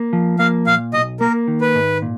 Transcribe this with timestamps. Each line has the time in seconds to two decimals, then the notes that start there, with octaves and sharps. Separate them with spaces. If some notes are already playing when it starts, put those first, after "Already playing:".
Already playing: A#3
0.13 F3
0.39 A#3 F5
0.67 A#2 F5
0.93 B1 D#5
1.20 A#3 A#4
1.48 D#3
1.61 B4
1.75 G#2
2.02 A#2